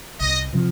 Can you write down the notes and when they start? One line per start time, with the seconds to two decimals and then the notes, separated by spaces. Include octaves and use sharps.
0.20 C2 D#5
0.53 C3 F3